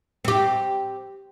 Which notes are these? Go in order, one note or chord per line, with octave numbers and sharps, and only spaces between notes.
C4 G4